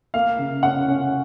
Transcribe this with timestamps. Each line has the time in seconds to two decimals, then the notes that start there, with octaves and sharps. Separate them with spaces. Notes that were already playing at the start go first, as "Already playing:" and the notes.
0.14 A#3 F5
0.39 C#3
0.63 C#4 F#5
0.88 C#4